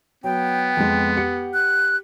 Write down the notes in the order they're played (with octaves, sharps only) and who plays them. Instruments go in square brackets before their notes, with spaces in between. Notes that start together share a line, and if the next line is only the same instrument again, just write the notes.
[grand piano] F#3 [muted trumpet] B3 [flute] G5
[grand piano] F2 G#3
G4 F#5 C#7
[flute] F#6